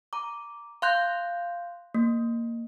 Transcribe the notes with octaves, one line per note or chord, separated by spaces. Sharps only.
A#5 D6
F5 C6 F#6 G6
A#3